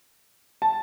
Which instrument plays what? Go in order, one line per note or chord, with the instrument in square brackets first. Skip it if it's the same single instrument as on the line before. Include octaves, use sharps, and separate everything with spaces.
[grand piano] A5